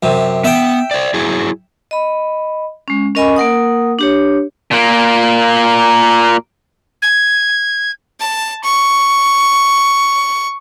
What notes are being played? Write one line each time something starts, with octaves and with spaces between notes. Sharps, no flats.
F#2 C3
B3 E5 G5
C5 D5
F#3 E4 G#4
D#5 B5
G#3 C#4
C#4 A#4 D#5 G#5 B5 C#6
A#3 A#4 F#5 D#6
D4 G4 C#5
A#2 A#3
G#6
A5
C#6